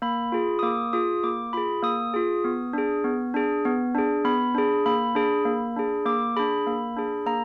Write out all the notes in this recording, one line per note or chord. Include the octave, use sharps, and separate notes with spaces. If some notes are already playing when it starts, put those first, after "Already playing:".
A#3 B5
F4 G#4
D#6
A#3 D6
F4 G#4 D#6
A#3 D6
F4 G#4 B5
A#3 D#6
F4 G#4
B3
D4 G#4
B3
D4 G#4
B3
D4 G#4
B3 B5
D4 G#4
A#3 B5
D4 G#4
A#3
D4 G#4
A#3 D6
D4 G#4 B5
A#3
D4 G#4
A#3 A#5